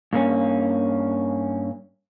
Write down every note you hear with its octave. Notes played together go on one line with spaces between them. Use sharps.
G2 A#3 C#4